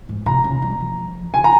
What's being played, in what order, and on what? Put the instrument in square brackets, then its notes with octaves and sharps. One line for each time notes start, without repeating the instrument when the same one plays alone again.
[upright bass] G#2
[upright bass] C3 [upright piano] A#5
[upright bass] C#3
G3
F3
[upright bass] C#3 [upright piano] G#5
[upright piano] A#5